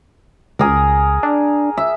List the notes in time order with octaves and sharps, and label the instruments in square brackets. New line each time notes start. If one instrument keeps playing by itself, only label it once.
[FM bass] C#2 [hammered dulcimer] G#4 A#4
[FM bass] D4
[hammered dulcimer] E5